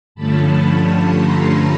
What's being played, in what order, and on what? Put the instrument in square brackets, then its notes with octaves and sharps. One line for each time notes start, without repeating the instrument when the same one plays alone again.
[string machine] G2 D3 F3 A3 C#4 A5 B5
A#5 C6